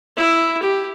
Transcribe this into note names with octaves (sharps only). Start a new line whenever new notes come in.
E4
G4